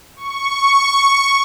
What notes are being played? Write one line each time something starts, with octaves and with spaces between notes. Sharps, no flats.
C#6